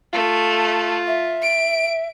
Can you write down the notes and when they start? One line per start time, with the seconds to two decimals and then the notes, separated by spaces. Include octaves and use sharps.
0.13 A3 F4
1.06 E5
1.42 D7